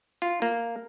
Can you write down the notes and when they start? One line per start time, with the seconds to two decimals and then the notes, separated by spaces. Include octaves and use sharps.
0.22 F4
0.42 A#3